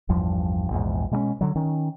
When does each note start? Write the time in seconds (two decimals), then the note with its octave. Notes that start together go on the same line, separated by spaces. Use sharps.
0.09 A1 E2 G2 F3
0.71 A#1 E2 G#2
1.11 B2 G#3 A#3 C#4
1.41 D3 F#3
1.55 D#3 C#4